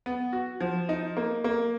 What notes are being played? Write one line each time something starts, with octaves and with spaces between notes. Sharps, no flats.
B3
F#4
F3
D#4
A#3
A#3